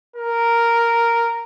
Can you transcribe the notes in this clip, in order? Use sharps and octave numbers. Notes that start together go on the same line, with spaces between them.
A#4